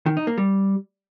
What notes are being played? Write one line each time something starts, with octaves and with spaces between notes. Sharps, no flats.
D#3
D#4
A#3
G3